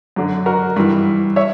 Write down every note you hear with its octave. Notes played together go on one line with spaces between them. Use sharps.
F#2 D3
F#4 A#4
G2 E3
C#5 E5